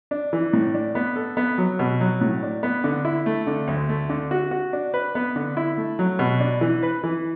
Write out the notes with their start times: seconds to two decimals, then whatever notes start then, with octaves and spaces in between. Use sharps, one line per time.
0.11 D4
0.33 E3
0.53 A2
0.74 D4
0.95 B3
1.16 A4
1.37 B3
1.58 F#3
1.79 B2
2.01 F#3
2.21 A2
2.43 D4
2.63 B3
2.84 D3
3.05 E4
3.26 A3
3.47 D3
3.68 D2
3.89 A3
4.10 D3
4.31 F#4
4.51 F#4
4.73 D4
4.94 B4
5.15 B3
5.36 D3
5.57 E4
5.77 A3
5.99 F#3
6.19 B2
6.40 D4
6.61 E3
6.83 B4
7.03 E3